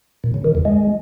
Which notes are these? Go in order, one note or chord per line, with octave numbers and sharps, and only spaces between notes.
A#2
C#3
D#3
E2
G#3